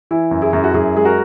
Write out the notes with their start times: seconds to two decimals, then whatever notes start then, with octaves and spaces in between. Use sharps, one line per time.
0.11 E3 E4
0.31 F#2
0.42 E4 G#4
0.53 F#2
0.64 F#4
0.74 F#2 E4 G#4
0.95 G#3 G#4
1.05 F#4 A#4